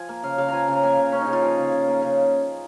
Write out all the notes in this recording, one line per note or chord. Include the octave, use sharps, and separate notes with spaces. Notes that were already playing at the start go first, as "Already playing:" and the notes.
Already playing: F3 G#5
A#3
C#3 F5
C#3 F5
F3 G#5 A#5
C#3
A#5
A#3 G#5
C#3
A#3 C#4
D#4
C#3
F4
F3 G#4
C#3
C#3
A#3
C#3